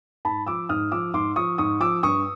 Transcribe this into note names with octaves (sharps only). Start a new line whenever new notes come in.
G#2 A5 B5
F3 D6 E6
G#2 D#6 F6
F3 D6 E6
G#2 C6 D6
F3 C#6 D#6
G#2 C#6 D#6
F3 D6 E6
G2 C#6 D#6